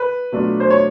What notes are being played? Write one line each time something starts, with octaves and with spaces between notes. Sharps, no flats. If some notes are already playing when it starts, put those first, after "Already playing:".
Already playing: B4
B2 F#3 A3 D4 F4
C5
C#5